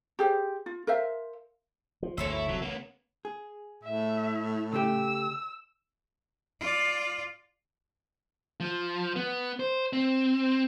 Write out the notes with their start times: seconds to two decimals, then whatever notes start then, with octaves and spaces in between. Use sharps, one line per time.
0.19 G4 G#4 C5
0.66 F4
0.87 A#4 C5 E5 F5
2.03 F3
2.18 G1 D2 A#3 A4 C5 C#5 E5
2.33 E4
2.49 E1 C2 F#3
2.62 C#3 A#3 B3
3.25 G#4
3.84 A2 E5
4.73 C#3 A3 G4 E6
6.60 F4 D5
8.60 F3
9.16 B3
9.60 C5
9.93 C4